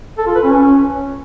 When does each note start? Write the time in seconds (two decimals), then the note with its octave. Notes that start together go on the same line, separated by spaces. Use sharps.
0.18 A4
0.27 F4
0.35 B4
0.44 C#4